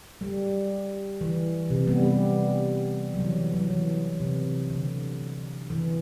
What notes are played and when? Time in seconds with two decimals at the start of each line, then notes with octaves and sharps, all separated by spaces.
0.21 G3
1.21 E3
1.70 C3
1.87 G3 B3
2.03 G3
3.14 F#3
3.20 E3
3.36 E3
3.53 F#3
3.70 E3
4.20 C3
4.70 D3
5.70 E3